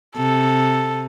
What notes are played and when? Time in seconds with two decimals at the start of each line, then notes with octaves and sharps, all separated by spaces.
0.17 C3 A4